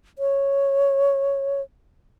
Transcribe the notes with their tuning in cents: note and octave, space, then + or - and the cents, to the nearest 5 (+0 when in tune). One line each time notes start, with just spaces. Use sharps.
C#5 -5